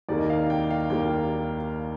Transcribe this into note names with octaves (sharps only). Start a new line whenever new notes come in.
D#2 D#3 G3 A#3 D5
D#5
F5
G5
F5
D#2 D#3 G3 A#3 G5